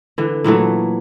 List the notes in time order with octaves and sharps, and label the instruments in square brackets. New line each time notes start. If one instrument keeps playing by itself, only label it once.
[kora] D3 E3
A#2 E3 F#3 A3